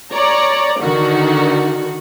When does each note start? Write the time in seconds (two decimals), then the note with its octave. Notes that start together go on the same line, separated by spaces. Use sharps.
0.12 C#5 D5 A#5
0.80 D3 D#3 F#4